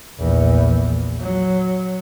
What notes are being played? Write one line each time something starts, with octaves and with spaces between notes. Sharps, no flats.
A#1 E2
F#3